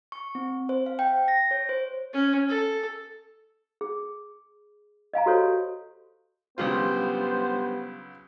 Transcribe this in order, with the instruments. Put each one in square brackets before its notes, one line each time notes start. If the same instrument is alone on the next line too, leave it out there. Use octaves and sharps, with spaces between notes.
[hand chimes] C#6
C4
C5
F5
G5
A#6
C#5
C5
[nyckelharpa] C#4
A4
[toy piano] G#4
D#5 F5 G#5 A#5
F#4 G4 A4 C5 C#5
[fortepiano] B1 C#3 F4 [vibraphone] G3 D4 G4 [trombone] B3 [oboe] C5